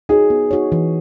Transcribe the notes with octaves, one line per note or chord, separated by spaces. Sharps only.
D#4 F#4 G#4 C#5
B3
D#4 F#4 C#5
E3